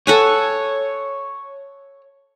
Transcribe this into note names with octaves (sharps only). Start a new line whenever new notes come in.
A4 C#5 F#5 G#5